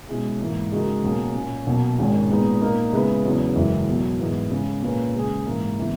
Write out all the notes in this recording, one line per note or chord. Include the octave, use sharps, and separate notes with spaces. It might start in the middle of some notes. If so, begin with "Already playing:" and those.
B2 G#3 C#4 E4 G#4
G#2 E3 A#3
C#3 G#3 D#4 F#4 A#4
B1 B2 A#3 C#4 G#4
A#2 A#3 C#4
B1 B2 A#3
G#1 G#2 D#3 G#3 C#4
A#2 G#3 B3 D#4
A#2 A#3 D#4 A#4
C#3 G#3 B3 E4 B4
E2 C#3 F#3 B3
F#1 F#2 E3 G#3
E2 B2 F#3
G#2 E3 G#3 B3
C#3 G#3 C#4
A#2 A#3 C#4 G#4 B4
C#3 G#3 C#4 G#4
G#2 E3 A#3
C#3 E3 B3